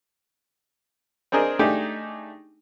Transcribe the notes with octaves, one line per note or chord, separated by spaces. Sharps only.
C4 D4 G#4 A#4 D#5
A3 D4 D#4 G4 G#4